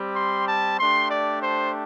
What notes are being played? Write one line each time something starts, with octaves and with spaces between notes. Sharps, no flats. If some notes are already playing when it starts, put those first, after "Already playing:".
Already playing: G3 C4 G4
C6
A5
A3 D4 G4 C6
D5
C5